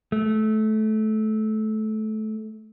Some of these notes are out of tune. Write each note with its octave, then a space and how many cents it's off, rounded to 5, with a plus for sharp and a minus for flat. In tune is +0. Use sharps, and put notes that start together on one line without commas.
A3 -20